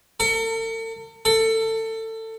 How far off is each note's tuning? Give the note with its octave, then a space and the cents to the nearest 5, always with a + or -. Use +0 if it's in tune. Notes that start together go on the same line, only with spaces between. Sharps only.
A4 +45
A4 +25